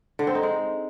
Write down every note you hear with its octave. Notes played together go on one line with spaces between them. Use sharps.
D3
C4
D#4
G#3